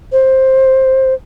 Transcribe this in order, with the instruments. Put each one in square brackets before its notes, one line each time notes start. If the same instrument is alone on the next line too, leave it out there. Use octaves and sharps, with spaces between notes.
[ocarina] C5